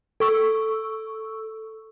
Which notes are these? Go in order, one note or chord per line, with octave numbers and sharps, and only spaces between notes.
A4 C#6 E6